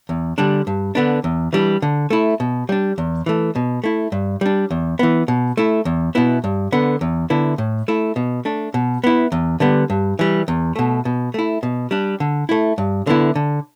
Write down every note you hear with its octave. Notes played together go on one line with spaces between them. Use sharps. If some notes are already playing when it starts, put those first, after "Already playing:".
E2
D3 G3 D4
G2
D3 B3 D4
E2
E3 G3 D4
D3
A3 E4
B2
G3 D4
E2
E3 A3
B2
A3 E4
G2
G3 D4
E2
E3 B3
B2
A3 E4
E2
B2 B3 E4
G2
D3 B3
E2
D3 B3 E4
A2
A3 E4
B2
A3 D4
B2
B3 E4
E2
D3 G3 B3
G2
E3 G3
E2
B2 A3
B2
A3 E4
B2
G3 D4
D3
A3 E4
G2
D3 B3 E4
D3